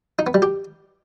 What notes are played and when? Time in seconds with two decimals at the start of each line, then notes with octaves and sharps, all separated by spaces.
0.19 D#4
0.27 B3
0.34 G3
0.42 G4